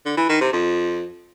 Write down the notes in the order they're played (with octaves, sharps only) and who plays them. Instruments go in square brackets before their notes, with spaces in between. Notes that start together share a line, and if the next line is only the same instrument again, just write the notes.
[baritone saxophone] D3
E3
D#3
C3
F2